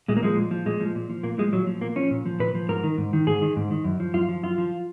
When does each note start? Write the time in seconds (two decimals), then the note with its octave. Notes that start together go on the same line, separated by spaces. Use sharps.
0.08 A#2 G#3
0.17 A#3
0.23 F3 G#3
0.37 A#2
0.51 F3
0.66 A#2 G#3
0.80 F3
0.95 A#2
1.10 F3
1.23 A#2 A#3
1.38 F3 G#3
1.53 A#2 F#3
1.67 F3
1.81 A#2 A#3
1.96 F3 C#4
2.11 A#2
2.26 F3
2.39 A#2 B4
2.55 F3
2.69 G#2 A#4
2.83 D#3
2.98 G#2
3.13 D#3
3.27 G#2 G#4
3.42 D#3
3.56 G#2
3.71 D#3
3.84 F#2
4.00 F3
4.14 F#2 F4
4.29 F3
4.43 F#2 F4
4.58 F3